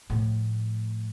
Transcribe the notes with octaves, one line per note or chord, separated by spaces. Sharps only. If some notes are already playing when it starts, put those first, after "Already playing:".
A2 F3